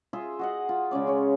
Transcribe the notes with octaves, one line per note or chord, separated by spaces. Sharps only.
F4 G#4 E5 C6
F#4 D#5 F#5
F4
C#3 G#3 C#4 D5
C#4 C#5